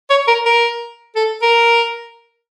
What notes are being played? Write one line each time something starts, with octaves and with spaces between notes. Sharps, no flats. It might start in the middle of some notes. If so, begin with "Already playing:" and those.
C#5
A#4
A#4
A4
A#4